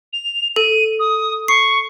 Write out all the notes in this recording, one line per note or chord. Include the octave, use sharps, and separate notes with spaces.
F7
A4 D#7
D#6
C#6 C7